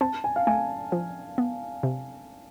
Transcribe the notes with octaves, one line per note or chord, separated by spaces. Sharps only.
C4 A5
G#5
F5
A3 G#5
F3
B3
C3